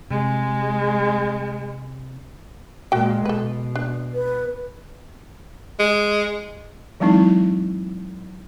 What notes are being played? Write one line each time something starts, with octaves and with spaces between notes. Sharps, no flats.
C3 G#3
A#2 G#3 F#4 G5
B2 A4 B4
D4
B4
G#3
E3 F#3 G#3 C4 D#4 E4